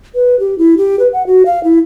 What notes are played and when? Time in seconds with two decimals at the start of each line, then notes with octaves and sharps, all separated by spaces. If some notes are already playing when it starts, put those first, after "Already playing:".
0.15 B4
0.40 G4
0.58 E4
0.77 G4
0.99 B4
1.13 F#5
1.27 F#4
1.46 F5
1.64 E4